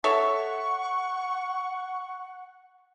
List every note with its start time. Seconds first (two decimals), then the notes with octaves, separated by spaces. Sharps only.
0.04 A4 C#5 E5 F#5 C#6